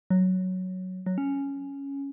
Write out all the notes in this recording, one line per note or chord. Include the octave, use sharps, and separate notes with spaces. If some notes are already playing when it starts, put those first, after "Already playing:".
F#3
F#3
C#4